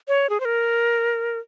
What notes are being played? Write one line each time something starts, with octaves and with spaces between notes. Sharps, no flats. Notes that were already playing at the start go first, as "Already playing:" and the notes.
C#5
G#4
C5
A#4